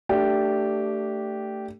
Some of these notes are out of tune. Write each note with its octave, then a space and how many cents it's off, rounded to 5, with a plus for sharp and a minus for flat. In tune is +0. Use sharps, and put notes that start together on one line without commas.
A3 +15 D4 +0 G4 -10